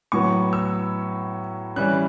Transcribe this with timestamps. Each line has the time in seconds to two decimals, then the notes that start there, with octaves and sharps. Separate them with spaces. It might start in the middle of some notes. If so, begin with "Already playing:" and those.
0.12 A2 F#3 B3 C#6
0.53 E6
1.76 E3 G3 C#4 F#6